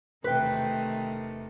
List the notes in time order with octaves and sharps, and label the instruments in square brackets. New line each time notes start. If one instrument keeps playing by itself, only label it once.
[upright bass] E1 [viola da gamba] C3 D#3 A3 [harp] B4 G5